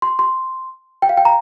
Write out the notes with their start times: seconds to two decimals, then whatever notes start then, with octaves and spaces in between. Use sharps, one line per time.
0.02 C6
0.19 C6
1.02 G5
1.09 F5
1.17 G5
1.25 A#5